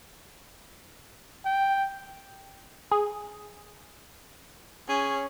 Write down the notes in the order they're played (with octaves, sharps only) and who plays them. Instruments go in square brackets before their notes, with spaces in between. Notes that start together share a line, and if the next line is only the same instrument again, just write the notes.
[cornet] G5
[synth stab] G#4
[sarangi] C#4 [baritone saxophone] G#4